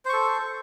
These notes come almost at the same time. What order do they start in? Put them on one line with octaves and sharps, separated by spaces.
C5 C#6 A4